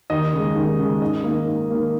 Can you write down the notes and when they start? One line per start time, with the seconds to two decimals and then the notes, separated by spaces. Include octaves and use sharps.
0.10 D#2 D#5
0.33 C#3 G#3
0.56 D#2
0.79 C#3 G#3
1.02 G#2 D#5
1.24 D#3 A#3
1.47 G#2
1.70 D#3 A#3